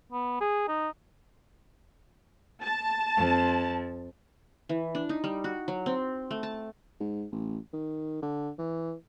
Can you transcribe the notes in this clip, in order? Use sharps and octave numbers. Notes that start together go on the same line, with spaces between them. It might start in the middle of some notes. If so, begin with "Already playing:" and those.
B3
G#4
D#4
A5
F2
E3
D4
D#4
G3
F#4
F#3
C4
A3
A5
G#2
A1
D#3
D3
E3